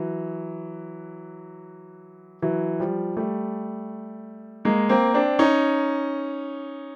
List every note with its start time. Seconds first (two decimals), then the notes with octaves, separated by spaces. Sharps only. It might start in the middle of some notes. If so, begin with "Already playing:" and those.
Already playing: E3 F#3
2.42 E3 F#3
2.80 F3 G3
3.17 G3 A3
4.65 G#3 A#3
4.89 A#3 C4
5.14 C4 D4
5.39 C#4 D#4